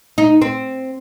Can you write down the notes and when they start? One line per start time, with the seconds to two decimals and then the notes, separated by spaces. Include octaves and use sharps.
0.18 D#4
0.42 C4